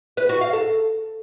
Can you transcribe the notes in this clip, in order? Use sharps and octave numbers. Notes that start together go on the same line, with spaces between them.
B4
F#4
F5
A4